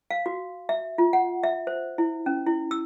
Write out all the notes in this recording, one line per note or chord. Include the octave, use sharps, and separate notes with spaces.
F5
F#4
E5
F4
F#5
E5
C5
E4
C#4
E4
E6